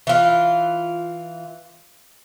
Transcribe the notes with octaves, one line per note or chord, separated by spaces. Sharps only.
E3 F4